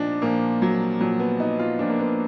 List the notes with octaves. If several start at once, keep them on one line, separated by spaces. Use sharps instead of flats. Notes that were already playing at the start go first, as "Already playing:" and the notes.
Already playing: A#2 F3 D4 D#4
A#2 F3 A#3
F#3
A#2 F3 F#3
B3
D#4
F4
A#2 F3 D4
A#3
B3